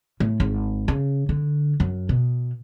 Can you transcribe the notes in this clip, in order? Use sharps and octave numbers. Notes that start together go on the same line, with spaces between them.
A2
G#1
C#3
D3
F#2
B2